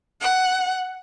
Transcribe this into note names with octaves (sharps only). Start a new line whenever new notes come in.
F#5